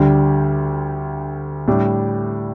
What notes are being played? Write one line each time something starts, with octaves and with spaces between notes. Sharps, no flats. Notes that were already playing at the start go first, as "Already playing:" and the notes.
Already playing: D2 D3 G3
A2 G3 D4